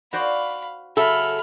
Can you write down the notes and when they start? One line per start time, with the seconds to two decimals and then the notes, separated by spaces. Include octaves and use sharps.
0.13 F#4 C5 D5 F5 B5
0.97 C#3 F#3 A4 E5 B5 F6